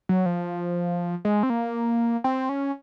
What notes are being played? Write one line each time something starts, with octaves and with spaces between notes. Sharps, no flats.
F#3
F3
G#3
C4
A#3
C4
C#4